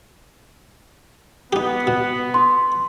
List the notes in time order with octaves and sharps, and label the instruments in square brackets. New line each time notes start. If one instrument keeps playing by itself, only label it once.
[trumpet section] B3 [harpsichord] D#4 G4
[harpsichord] B2
[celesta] C6